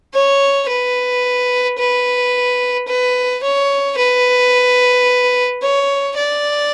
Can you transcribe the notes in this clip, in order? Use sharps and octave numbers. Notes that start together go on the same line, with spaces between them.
C#5
B4
B4
B4
C#5
B4
C#5
D5